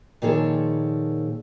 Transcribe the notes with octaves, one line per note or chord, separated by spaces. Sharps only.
A#2 D#3 F3 G#4 A4 C#5